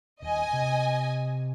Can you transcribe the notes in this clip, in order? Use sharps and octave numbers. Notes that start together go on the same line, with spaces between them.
D#1 D#5 G#5
C3